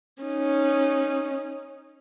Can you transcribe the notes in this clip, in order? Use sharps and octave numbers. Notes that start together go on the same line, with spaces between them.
C#4 D#4